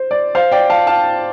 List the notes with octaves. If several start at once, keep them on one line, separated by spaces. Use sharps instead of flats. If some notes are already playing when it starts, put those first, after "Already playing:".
Already playing: C5
D5
C5 F5
D5 G5
F5 A5
F5 A5